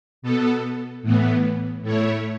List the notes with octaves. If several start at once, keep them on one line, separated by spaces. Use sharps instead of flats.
B2 B3 A4
A2 E3 B3
A2 A3 E4 C#5